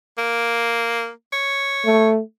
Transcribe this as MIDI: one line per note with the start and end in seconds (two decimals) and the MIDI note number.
0.18 1.10 58
1.33 2.10 73
1.86 2.20 57